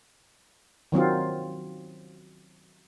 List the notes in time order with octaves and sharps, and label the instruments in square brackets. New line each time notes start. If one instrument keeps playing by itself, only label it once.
[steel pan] D#3 F#3 C4 F4